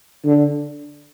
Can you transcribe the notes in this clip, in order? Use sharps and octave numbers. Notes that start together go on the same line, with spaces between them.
D3